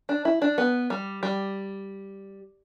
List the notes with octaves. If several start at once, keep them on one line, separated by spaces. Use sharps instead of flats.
D4
E4
D4
B3
G3
G3